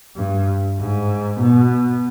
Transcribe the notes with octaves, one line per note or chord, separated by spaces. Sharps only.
G2
G#2
B2